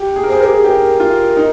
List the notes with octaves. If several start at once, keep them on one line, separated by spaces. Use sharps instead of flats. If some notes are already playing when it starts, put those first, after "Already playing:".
Already playing: G4
G#4
A#4
G#4 C5
G4 A#4
G#4
G4 A#4 C5
F4
D#4